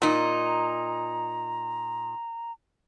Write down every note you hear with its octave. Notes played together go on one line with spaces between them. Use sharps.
A#2 D#4 A#5